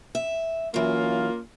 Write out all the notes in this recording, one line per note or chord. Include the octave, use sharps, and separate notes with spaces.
E5
E3 F#3 A#3 C#4 F4